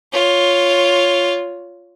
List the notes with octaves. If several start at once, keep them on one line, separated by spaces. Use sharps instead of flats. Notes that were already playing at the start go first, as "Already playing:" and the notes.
F4 C#5